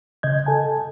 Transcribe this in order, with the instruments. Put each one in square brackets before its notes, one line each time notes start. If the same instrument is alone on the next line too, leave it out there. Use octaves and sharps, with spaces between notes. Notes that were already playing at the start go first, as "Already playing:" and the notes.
[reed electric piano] C#3 D#5 G6 G#6
A4 G#5 A5